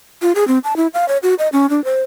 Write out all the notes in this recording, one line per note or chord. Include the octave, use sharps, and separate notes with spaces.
F4
G#4
C4
A5
E4
F5
C#5
F#4
D#5
C#4
D4
C5